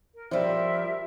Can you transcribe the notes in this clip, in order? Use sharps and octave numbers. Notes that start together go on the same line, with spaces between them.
A#4
F3 G3 A#4 E5